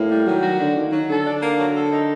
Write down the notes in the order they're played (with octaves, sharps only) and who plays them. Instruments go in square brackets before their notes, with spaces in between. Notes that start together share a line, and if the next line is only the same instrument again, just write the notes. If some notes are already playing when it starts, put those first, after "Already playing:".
Already playing: [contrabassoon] A2 [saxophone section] A#3
[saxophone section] G3
[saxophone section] D#3 [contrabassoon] F#3
[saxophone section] F#4
[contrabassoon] D3 [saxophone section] D4
[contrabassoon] D#3 [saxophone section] A#3
[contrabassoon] D#3 [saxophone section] F#3
[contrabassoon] D3 [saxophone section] A4
[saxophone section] D4
A#3
F#3
A4
D#4